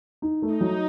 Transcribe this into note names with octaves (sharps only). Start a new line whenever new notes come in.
D#4
A3
D#4
F#3